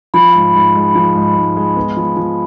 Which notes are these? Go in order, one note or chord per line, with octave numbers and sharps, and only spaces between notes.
F3 B5
G#2
G#2
G#3
F3
G#2
G#2
G#3
B3
F3
F3